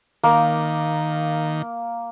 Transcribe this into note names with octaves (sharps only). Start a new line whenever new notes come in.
D#3 A#3